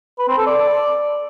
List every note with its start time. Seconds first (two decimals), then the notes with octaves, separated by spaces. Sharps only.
0.19 B4
0.28 C4
0.37 A4
0.47 D5